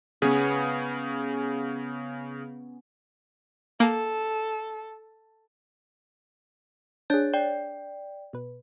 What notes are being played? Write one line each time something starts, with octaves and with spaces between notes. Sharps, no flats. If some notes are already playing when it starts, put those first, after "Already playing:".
C#3 B3 C#4 G#4
A#3 A4
D4 G#4 C#5 G6 A6
D5 G5
B2 B4